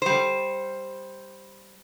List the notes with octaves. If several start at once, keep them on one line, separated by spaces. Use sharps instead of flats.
G3 C5